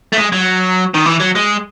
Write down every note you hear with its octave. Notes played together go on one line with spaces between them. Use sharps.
A3
G#3
F#3
D#3
E3
F#3
G#3